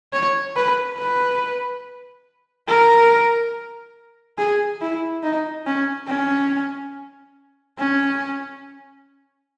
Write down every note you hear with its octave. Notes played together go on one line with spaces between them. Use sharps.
C#5
B4
B4
A#4
G#4
E4
D#4
C#4
C#4
C#4